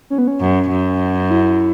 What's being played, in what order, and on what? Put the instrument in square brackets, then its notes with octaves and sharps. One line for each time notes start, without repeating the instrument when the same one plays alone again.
[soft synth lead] C#4
B3
C#4
[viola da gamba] F#2
F#2
[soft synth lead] E4